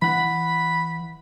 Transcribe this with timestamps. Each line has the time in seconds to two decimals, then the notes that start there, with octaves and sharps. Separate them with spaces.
0.02 E3 F#5 B5